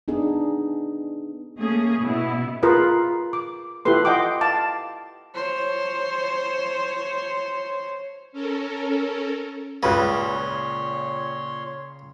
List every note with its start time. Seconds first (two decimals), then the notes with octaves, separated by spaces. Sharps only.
0.08 B3 D4 D#4 G#4
1.58 A3 A#3 C#4 G#4
1.99 B2 B3 E4
2.63 F4 G#4 A#4 B4 F5
3.33 D6
3.85 E4 F4 G4 A4 B4 C6
4.05 D#5 F#5 G5 C6 D6
4.41 F5 A5 D6
5.35 C5 C#5
8.32 C#4 A4 A#4
9.83 C#2 A#2 C#3 B4 C#5 C6